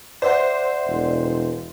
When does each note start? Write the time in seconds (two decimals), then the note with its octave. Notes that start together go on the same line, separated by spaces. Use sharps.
0.22 C5 D5 E5 F#5
0.88 E1